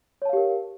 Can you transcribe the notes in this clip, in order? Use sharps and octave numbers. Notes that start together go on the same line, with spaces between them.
G4 A#4 C#5 F5 A5